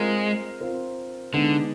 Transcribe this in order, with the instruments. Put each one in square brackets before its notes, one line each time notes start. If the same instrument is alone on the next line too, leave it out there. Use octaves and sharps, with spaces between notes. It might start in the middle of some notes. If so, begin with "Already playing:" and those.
Already playing: [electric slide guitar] G#3 [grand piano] C4 F4 A#4
[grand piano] C4 F4 A#4
[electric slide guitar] D3 [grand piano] G#3 B3 D#4